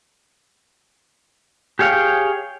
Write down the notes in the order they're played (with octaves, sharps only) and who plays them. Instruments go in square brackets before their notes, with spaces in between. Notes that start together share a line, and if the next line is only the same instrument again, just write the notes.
[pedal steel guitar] G4 G#4 C#5 F5 G5